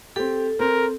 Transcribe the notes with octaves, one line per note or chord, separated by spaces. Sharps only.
C4 G4 A4
C4 A#4